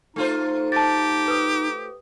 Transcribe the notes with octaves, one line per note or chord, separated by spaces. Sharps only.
A3 D#4 F4 C5
G4 A5 A6
B4 D#6